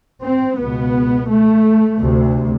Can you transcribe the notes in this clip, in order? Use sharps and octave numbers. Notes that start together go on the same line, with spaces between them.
C4
C#2 B2 B3
A3
D2 C3